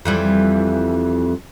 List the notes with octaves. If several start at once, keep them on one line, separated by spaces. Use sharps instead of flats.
F2 E3 G3